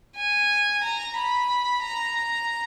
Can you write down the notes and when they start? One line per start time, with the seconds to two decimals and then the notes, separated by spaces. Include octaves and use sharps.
0.16 G#5
0.83 A#5
1.16 B5
1.83 A#5